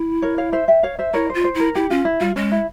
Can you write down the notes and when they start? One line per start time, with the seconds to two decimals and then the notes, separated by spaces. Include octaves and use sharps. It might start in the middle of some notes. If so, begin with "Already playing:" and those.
Already playing: E4
0.22 A#4 C#5
0.38 C#5 F5
0.52 C5 E5
0.68 E5 G5
0.83 C#5 F5
0.99 C5 E5
1.14 E4 A#4 C#5
1.30 F4 C5
1.44 C5
1.55 E4
1.60 A#4
1.75 E4 G4
1.90 C#4 F4
2.05 E4
2.21 G3 F4
2.36 G#3 C#4
2.52 E4